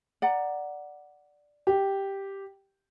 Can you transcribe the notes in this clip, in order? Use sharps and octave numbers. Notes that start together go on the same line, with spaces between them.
D5 F#5 A#5
G4